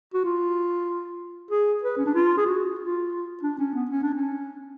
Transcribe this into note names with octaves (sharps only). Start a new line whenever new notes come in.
F#4
F4
G#4
B4
C#4
D4
F4
G#4
F#4
F4
D4
C#4
B3
C#4
D4
C#4